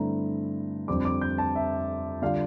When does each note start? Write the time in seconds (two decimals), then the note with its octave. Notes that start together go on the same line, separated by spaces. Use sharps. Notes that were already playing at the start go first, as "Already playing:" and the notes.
Already playing: G2 D3 A3 C4 E4 A#5
0.88 F2 D3 G3 C4 D6
1.05 D6
1.21 G6
1.38 A5
1.56 E5
2.22 D3 G3 D4 F4 F5